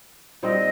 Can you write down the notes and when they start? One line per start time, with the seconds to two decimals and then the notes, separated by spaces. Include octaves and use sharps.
0.43 A#2 G3 C4 D#4 D#5